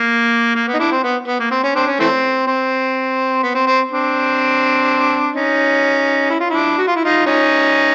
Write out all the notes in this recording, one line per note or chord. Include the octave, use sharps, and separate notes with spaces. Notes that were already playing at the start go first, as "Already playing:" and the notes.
Already playing: A#3
A#3
B3
D#4
D4 E4
C4
B3
B3
A#3
C4
C#4
C4 D4
C#4
E3 A3 C4
C4
B3
C4
C4
C4 D4
C#4 D#4
E4
F4
D4 E4
F#4
F4
E4
D#4 F4
C#4 D#4